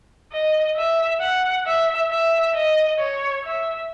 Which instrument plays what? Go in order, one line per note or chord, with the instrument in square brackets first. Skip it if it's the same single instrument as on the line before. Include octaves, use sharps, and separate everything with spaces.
[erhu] D#5
E5
F#5
E5
E5
D#5
C#5
E5